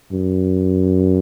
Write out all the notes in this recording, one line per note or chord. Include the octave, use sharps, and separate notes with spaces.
F#2